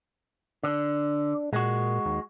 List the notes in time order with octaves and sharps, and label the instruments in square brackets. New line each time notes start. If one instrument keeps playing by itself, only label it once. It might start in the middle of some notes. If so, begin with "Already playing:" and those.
[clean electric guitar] D3 [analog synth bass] D4
[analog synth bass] A#2 [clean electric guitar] G#3 F#4
[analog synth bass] D#2